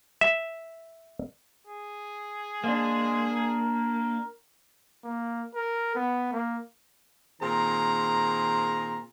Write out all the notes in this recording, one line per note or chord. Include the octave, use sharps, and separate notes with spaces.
E5
G#4
G#3 A#3 D4
A#4
A#3
A#4
B3
A#3
A#2 D#3 C4 G#4 A#5